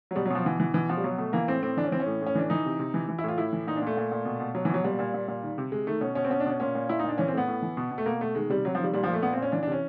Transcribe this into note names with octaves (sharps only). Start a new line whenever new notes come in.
F#3
B2 G3
F#3
B2 F3
B2 E3
B2 E3
B2 E3
B2 F3
G3
B2 F#3
B2 A3
E3 A#3
A2 C4
A2 C4
E3 D4
C#4
E3 C4
C#4
A2
A2 C#4
E3 D4
E3 D#4
C3
C3
E3
E3
E4
A2 F4
A2 E4
E3
A#2 D#4
D4
A#2 A3
A#2
A#2
B2
B2
B2 F#3
E3
B2 F#3
A#2 G3
A#2
A#2
A#2
D#3
C3
C3 G#3
D#3 A3
B2 C#4
B2 C#4
C4
B2 C#4
D4
B2 C#4
A#2 C#4
A#2
A#2 E4
D#4
A#2 D4
E3 C#4
C4
A2 B3
A2
E3
B2
B2
A3
B2 A#3
B2 A3
D#3 G#3
C3 G3
C3 F#3
F3
D#3 G3
A#2 G3
F3
A#2
A3
A#2 B3
C4
A#2
C#4
E3 D4
D4
C3 C#4